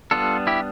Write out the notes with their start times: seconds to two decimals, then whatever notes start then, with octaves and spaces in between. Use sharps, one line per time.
0.11 G3 B3 D4 F4 A4
0.47 E4 G4